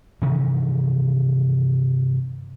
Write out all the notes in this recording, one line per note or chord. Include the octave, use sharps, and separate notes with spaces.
G2 C3 D#3 E3